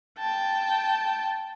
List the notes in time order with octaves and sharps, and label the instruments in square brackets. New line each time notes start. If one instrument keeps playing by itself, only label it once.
[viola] G5 A5